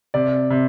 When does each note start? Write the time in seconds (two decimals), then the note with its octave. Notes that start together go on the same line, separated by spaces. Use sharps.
0.14 C3 D5
0.50 C3